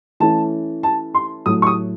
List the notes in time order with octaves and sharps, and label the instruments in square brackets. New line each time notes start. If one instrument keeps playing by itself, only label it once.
[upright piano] E3 A3 C#4 A5
A5
C6
A2 F#3 A3 D#6
C#6
D#6